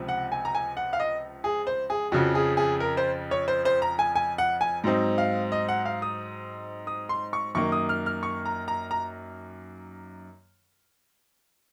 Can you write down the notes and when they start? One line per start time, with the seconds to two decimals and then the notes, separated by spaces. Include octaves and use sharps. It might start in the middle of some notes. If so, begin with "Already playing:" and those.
Already playing: C#2 C3 F3 C4
0.08 F#5
0.32 G#5
0.45 A#5
0.55 G#5
0.77 F#5
0.93 F5
1.00 D#5
1.44 G#4
1.67 C5
1.90 G#4
2.12 F2 C#3 F3 F#4
2.35 G#4
2.57 G#4
2.80 A#4
2.97 C5
3.31 C#5
3.48 C5
3.65 C5
3.82 A#5
3.99 G#5
4.15 G#5
4.38 F#5
4.61 G#5
4.84 G#2 F#3 C4 D#4
5.18 F5
5.52 D#5
5.69 F#5
5.85 F5
6.02 D#6
6.87 D#6
7.09 C6
7.33 C#6
7.55 F#2 D#3 A#3 C#6
7.72 D#6
7.89 F6
8.06 F6
8.23 C#6
8.46 A#5
8.68 A#5
8.91 A#5